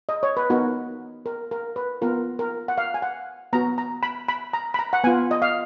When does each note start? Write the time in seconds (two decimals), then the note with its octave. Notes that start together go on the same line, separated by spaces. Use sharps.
0.09 D#5
0.23 C#5
0.37 B4
0.50 B3 D#4 F#4 A#4
1.26 A#4
1.51 A#4
1.76 B4
2.02 B3 F4 A#4
2.39 A#4
2.68 F#5
2.78 F5
2.94 G#5
3.02 F#5
3.53 B3 F#4 A#5
3.78 A#5
4.03 B5
4.28 B5
4.53 A#5
4.74 B5
4.79 A#5
4.93 F#5
5.04 B3 F4 G#5
5.31 D#5
5.42 F5